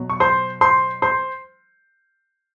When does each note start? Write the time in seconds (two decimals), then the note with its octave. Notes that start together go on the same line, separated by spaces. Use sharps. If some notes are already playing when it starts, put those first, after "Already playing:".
Already playing: B2 F#3
0.10 C#6
0.20 C5 C6
0.61 C5 C6
1.02 C5 C6